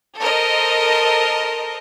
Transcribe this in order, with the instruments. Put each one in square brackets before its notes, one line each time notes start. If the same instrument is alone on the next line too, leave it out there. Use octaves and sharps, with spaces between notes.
[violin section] A4 A#4 C5 D#5